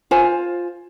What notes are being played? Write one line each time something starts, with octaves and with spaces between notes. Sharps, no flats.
F4 C5 G#5